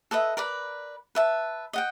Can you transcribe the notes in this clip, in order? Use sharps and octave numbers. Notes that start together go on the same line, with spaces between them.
A4 B4 D#5 E5
A#4 B4 D5 B5
B4 E5 A5
D#5 F#5 G5